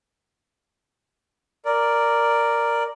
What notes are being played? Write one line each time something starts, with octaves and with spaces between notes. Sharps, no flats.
A#4 D5